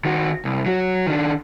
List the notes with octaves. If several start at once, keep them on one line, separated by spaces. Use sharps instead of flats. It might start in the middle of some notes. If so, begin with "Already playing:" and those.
D#3 F#4
C2
F#3 F#4
D#3 D4